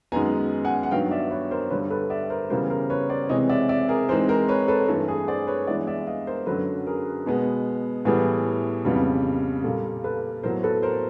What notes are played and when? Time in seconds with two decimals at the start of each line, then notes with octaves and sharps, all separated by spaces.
0.12 F#2 D#3 G#3 B3 G#5 A#5
0.65 F#5 G#5
0.83 F#5
0.91 G2 D#3 F#3 B3 F5 G5
1.11 D5 E5
1.31 B4 C#5
1.51 A#4 C5
1.70 G2 D3 G3 B4 C#5
1.90 A4 B4
2.10 D5 E5
2.30 A#4 C5
2.49 C#3 E3 G3 B3 A#4 C5
2.70 A#4 C5
2.90 B4 C#5
3.09 C5 D5
3.29 C3 E3 G#3 C4 C#5 D#5
3.49 D5 E5
3.69 D5 E5
3.89 G#4 A#4
4.08 G#2 E3 G#3 C4 A#4 C5
4.29 A#4 C5
4.49 B4 C#5
4.68 A4 B4
4.88 G2 E3 A3 A4
5.08 G#4
5.28 C5 D5
5.47 B4 C#5
5.67 G2 E3 G#3 B3 D5 E5
5.87 D5 E5
6.07 D#5 F5
6.27 A#4 C5
6.46 F#2 D3 F#3 A4 B4
6.86 G#4 A#4
7.26 B2 G#3 B3
8.05 A2 E3 G3 B3 G#4
8.85 F2 C#3 E3 G3 B3
9.64 A#2 G3 A#3 A4
10.04 A4 B4
10.43 A2 F#3 B3 A#4 C5
10.63 A4 B4
10.83 A#4 C5